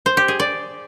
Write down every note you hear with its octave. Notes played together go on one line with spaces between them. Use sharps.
C5
G4
G#4
D5